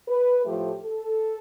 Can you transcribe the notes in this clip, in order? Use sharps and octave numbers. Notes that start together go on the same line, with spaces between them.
B4
A2 F3 A3 G4
A4